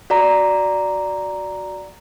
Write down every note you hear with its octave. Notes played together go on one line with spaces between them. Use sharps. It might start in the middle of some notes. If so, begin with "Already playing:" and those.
F#4 D5 A#5